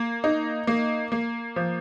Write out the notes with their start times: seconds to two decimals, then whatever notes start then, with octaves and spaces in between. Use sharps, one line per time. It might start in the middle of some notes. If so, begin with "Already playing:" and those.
Already playing: A#3
0.24 D#4
0.67 A#3
1.12 A#3
1.56 F3